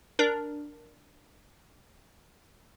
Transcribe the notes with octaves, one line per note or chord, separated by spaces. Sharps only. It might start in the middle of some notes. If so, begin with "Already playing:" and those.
D4 A#4